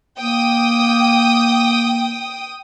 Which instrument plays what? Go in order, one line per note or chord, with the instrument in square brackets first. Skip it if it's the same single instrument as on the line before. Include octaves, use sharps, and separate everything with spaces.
[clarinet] A#3 [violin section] G5 D#6